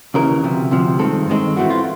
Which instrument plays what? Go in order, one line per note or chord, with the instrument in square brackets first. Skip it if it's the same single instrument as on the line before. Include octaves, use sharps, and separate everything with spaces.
[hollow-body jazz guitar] D#2 C#3 E3 A#4
D2 C3 F3
D2 C3 F3
G2 D#3 G#3 C4 A4
G2 D#3 G#3 C4
A2 E3 A3 C4 F#4
F4